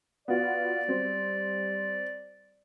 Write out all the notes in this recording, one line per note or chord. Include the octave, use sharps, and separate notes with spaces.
B3 F4 F#4 D5
G3 C4